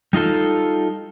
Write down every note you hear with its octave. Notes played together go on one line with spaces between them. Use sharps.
G3 D#4 F4 A4